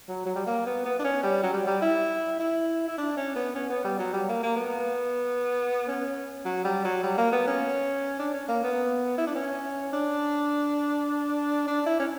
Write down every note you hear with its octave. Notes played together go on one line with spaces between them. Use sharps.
F#3
F#3
G3
A#3
B3
B3
D4
C#4
G3
F#3
G3
G3
E4
E4
E4
D4
C#4
B3
C#4
B3
G3
F#3
G3
A#3
A#3
B3
C#4
F#3
G3
F#3
G3
A#3
B3
C#4
D4
C#4
A#3
B3
E4
D4
C#4
D4
D4
E4
C#4